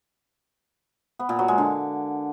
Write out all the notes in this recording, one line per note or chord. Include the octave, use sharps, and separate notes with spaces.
B3
A#2
F#3
G#3
D3